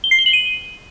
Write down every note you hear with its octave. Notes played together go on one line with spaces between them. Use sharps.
G7
C7
G7
F#7
D#7